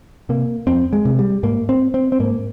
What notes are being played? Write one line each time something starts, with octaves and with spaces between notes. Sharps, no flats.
C3 A#3
F2 C4
G#3
C3
G3
G#2 A#3
C4
C4
C4
G#2 A#3